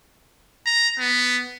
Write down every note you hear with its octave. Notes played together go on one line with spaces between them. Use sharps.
A#5
B3